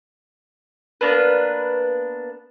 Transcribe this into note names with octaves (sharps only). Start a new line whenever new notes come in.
A#3 B3 D4 B4